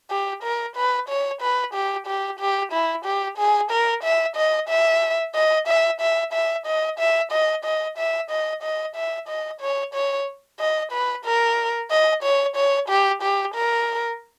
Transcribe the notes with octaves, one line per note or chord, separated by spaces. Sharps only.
G4
A#4
B4
C#5
B4
G4
G4
G4
E4
G4
G#4
A#4
E5
D#5
E5
D#5
E5
E5
E5
D#5
E5
D#5
D#5
E5
D#5
D#5
E5
D#5
C#5
C#5
D#5
B4
A#4
D#5
C#5
C#5
G4
G4
A#4